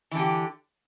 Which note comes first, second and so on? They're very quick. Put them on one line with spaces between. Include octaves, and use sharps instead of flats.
E3 D3 G4